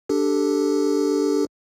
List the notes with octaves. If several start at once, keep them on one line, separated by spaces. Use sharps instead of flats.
D4 G4 A4